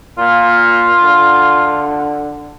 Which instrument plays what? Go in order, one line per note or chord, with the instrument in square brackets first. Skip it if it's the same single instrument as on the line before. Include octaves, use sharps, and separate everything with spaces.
[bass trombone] A#2 [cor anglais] F4
[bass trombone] D3